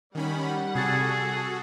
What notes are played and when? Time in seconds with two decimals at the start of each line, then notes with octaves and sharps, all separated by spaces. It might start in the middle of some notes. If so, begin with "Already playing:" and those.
0.15 D#3 G3 C#4 F#5 B5
0.75 C3 F#4 G#4 A4 A6